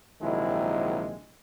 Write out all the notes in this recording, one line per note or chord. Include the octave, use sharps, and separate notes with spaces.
A#1 C3 D#3 F#3 G#3 E4